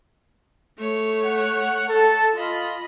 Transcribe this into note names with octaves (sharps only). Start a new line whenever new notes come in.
A3 C#5
F#5
A4
F4 D#5 B5